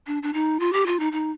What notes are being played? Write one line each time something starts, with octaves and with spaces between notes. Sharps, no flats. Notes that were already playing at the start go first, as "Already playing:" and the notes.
D4
D4
D#4
F4
G4
F4
D#4
D#4